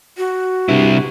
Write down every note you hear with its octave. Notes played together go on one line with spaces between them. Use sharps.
F#4
G2 C3 E4